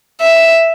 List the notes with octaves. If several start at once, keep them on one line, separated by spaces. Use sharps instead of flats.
E5